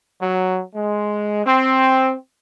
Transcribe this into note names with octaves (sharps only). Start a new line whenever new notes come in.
F#3
G#3
C4